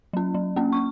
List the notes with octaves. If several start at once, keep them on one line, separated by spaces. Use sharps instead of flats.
F#3 C#4
F#3
A#3 C#4
C#6